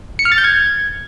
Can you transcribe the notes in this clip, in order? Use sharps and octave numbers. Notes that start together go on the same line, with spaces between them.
C#7
F6
A6
G6
G#6